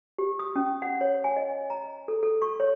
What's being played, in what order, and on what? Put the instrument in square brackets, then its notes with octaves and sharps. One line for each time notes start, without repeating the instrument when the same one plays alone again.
[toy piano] G4
D#6
C#4
F#5
C#5
G#5
D#5
A#5
A4
A4
C#6
C#5